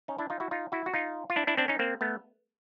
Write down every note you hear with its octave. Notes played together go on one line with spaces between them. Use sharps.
C#4 D#4
D4 E4
D#4 F4
E4 F#4
D#4 F4
E4 F#4
F#4
D#4 F4
F4
D4 E4
D4 E4
C4 D4
C#4 D#4
A#3 C4
A3 B3